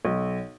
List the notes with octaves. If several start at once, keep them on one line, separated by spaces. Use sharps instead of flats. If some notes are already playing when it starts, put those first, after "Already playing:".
B1